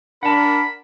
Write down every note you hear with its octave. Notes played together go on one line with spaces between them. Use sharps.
D4 A#4 F#5 A5 B5